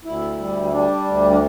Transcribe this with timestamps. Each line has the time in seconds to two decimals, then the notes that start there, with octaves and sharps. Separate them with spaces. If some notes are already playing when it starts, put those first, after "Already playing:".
0.05 D2 E4
0.38 G3
0.65 E4
0.71 G3 D4
1.05 D2
1.30 D4